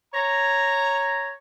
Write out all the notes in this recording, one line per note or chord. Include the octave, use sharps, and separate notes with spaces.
C#5 A#5